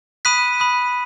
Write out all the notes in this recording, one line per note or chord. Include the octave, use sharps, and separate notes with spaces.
B5 D#6 F#6 B6 D#7
B5 D#6 F#6